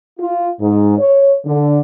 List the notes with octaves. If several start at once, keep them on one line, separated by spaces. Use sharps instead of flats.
F4
G#2
C#5
D3